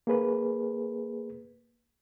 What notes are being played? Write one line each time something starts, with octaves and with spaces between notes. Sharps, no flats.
A#3 G#4 B4